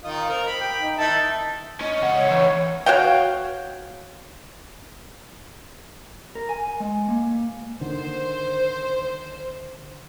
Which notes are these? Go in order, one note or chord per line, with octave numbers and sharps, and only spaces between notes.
D#3 F4 D#5
C4 A#4
B5
G5
D#4
D#3 D#4 E4 A5
C#4 D#5
C#2 F#5
C#5
E3 D#4
F#4 C#5 F5 G5
A#4
G#5
G#3
A#3
D3 D#3 C5